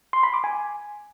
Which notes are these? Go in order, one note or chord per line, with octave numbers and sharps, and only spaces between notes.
C6
B5
D6
G#5